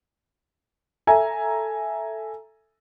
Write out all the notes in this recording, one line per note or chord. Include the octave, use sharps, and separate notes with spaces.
A4 E5 G#5 A#5